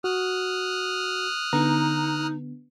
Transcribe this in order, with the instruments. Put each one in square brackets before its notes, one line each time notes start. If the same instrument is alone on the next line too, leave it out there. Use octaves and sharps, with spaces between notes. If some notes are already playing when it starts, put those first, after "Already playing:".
[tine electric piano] F#4 [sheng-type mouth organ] D#6 F6 F#6
[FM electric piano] D3 B3 [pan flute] D#4 [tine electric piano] A#5